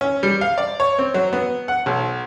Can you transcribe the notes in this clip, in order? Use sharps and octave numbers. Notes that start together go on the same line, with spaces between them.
C#4
G3
F5
D5
C#5
C4
F#3
B3
F#5
B1